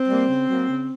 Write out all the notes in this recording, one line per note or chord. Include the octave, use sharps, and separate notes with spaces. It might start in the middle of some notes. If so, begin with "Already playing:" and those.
Already playing: C4
G3 A#3
C#3
F#3 A#3
C#3